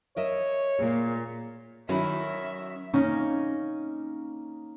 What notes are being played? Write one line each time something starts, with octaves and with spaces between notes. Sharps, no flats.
A#4 C#5 D#5 E5
A#2 A#3 G#4
D#3 F#3 C#4 E4 E5
A#3 C#4 D#4